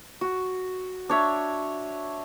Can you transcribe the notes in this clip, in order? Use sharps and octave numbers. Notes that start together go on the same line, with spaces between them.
F#4
D4 C#5 E5